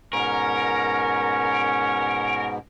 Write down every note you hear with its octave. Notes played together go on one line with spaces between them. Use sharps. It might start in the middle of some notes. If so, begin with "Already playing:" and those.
G#2 B2 C#4 A#4